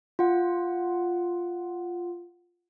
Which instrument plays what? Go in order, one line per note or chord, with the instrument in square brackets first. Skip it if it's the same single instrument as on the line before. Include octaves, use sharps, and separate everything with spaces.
[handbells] F4 F#5